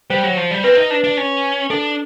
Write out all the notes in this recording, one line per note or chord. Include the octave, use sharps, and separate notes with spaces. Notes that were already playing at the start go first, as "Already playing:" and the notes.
G3 C5
F#3
F3
G3
C4 B4
D#4
D4
D4
C#4
D4 A4